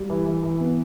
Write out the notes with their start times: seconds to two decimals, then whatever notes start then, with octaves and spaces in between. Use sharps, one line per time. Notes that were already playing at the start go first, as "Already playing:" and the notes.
Already playing: G3
0.10 E3
0.26 E3
0.43 E3
0.60 B3